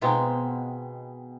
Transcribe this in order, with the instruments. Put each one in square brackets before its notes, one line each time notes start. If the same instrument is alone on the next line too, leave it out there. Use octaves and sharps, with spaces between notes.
[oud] B2 B3 [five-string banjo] D#3 G#3 C4 F4